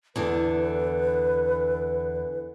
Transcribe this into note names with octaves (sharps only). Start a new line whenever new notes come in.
E2 D3 D4 B4